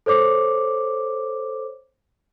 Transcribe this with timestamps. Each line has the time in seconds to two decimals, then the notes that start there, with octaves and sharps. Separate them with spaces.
0.06 A4 C5 C#5 D6